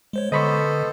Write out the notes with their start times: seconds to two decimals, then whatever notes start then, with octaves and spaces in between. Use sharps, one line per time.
0.13 G#3 C5 C#5
0.32 D3 B3 A4 C5 D#5 B5 C#6